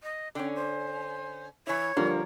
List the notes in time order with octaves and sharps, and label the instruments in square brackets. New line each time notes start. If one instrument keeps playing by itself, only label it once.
[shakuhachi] D#5
[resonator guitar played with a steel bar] D3 C#4 [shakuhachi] G5
[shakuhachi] C5
[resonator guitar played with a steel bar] E3 E4 [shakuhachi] C#5
[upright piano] D3 F3 G3 [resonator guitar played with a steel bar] A#3 A#4